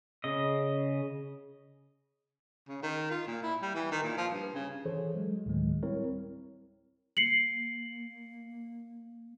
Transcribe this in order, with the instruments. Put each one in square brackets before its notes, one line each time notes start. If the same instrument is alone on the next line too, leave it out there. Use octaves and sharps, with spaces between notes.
[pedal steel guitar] C#3 D#5
[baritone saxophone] C#3
D#3
F4
A#2
E4
G3
E3
D#3
A#2
F3
G2
C#3
[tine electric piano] E3 G#4 A4 C5 C#5
F#3 G#3
D2 A2 D#3 F#3 G#3 A3
G3 C4 E4 A#4 C#5
[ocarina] A#3 [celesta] C7 C#7 F#7